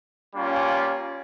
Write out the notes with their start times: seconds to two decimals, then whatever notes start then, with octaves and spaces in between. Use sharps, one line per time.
0.32 G3 A#3 C#4 F4